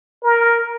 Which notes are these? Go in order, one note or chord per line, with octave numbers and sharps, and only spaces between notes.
A#4